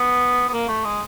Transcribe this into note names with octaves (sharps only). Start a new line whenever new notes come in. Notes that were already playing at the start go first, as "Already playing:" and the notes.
Already playing: B3
B3
A#3
A3
G#3